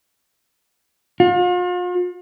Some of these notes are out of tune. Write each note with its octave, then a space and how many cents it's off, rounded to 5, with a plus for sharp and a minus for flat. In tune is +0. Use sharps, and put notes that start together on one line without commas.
F4 +40